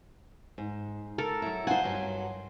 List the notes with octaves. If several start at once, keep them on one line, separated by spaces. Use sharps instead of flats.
G#2
A4 A#4
F#3 E4
D#4 F4 C5 F#5 G#5
G2 F#3